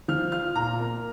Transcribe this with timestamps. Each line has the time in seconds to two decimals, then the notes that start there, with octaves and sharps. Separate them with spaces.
0.08 F3 F6
0.32 F4 F6
0.56 A#2 A#5
0.80 A#3